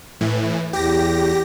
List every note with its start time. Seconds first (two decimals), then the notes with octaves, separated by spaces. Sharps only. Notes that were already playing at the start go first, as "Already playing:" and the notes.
0.21 A2 E3
0.73 E2 G4 A#6